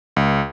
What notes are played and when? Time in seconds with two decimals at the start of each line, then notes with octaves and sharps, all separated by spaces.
0.16 C#2